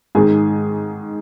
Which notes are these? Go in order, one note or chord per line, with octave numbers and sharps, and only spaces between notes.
G#2 D#3 G#4